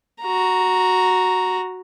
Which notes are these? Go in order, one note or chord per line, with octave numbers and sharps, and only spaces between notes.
F#4 A#5